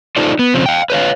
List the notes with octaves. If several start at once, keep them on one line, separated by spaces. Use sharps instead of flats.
D#4 F4 A4 C5 D5
B3
C#3 F3 C4
F5 G5
B4 C#5 F5